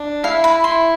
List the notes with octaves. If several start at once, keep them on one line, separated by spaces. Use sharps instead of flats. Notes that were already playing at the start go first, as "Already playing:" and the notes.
Already playing: D4
E4 F5
B5
E4 C6